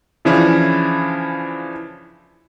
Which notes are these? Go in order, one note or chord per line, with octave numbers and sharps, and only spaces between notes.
C#3 E3 F3 C#4 D4 E4